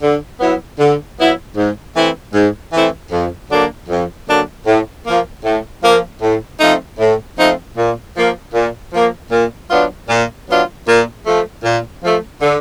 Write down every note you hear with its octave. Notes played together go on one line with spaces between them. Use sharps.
D3
F#3 B3 E4
D3
F#3 B3 E4
G#2
E3 A3 C4 E4
G#2
E3 A3 C4 E4
F2
D3 F#3 A#3 D4
F2
D3 F#3 A#3 D4
A2
F3 A#3
A2
F3 A#3
A2
F3 A3 C4 D#4
A2
F3 A3 C4 D#4
A#2
F3 A#3
A#2
F3 A#3
A#2
F#3 B3 D4 F4
A#2
F#3 B3 D4 F4
A#2
F3 A3
A#2
F3 A3
D3